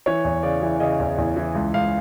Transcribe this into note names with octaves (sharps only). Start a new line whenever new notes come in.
E3 C#5
E2
C#3 D5
E3
C#3 D#5
E2
E2
E3
C#2
C#2 F5